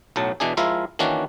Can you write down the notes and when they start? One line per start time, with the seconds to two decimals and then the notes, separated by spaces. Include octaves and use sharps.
0.16 B1 A2 F#3 A5
0.40 B2 E3 D4 G#4
0.57 F3 G#3 E4 F4 A#4 E5
0.99 D#3 E3 A#3 C#4 D4 F#4